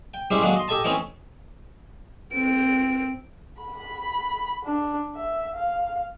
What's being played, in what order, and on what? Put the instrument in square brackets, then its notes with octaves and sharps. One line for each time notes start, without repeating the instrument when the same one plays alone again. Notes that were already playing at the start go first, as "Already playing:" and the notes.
[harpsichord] G5
G3 G#3 C#4 E4 G4 C5
D3 D#3 F#3 G#3 A#3 D4
D#5 C6
G4 A4 D#5 G#5 A5
E3 A3 C4 C#4 D#4 C#5
[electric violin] C4 D7
[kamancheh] B5
D4
E5
F5